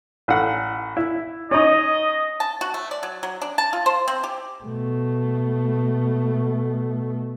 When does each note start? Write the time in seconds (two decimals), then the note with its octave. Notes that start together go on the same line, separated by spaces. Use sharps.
0.28 A1 F#5
0.97 E4
1.51 C#4 D#4 D#5
2.40 A5
2.61 F#4
2.74 A3
2.91 D5
3.03 F#3
3.23 F#3
3.41 D4
3.58 A5
3.73 F4
3.86 C5
4.08 C4
4.23 G4
4.64 B2 A3